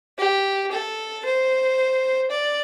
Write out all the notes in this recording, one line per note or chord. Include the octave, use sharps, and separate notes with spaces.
G4
A4
C5
D5